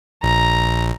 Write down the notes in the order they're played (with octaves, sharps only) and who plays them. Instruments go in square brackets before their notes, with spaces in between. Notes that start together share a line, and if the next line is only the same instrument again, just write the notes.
[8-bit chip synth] A#1 [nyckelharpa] A#5